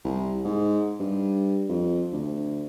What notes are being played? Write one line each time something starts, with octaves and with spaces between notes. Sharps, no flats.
C2
G#2
G2
F2
D2